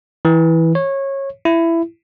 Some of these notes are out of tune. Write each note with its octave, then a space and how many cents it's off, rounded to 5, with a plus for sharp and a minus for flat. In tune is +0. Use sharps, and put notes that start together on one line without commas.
E3 -10
C#5 -20
E4 +15